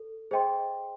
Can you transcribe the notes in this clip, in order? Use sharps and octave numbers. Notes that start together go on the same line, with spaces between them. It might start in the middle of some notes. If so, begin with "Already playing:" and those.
Already playing: A4
G#4 C5 D#5 G5 C6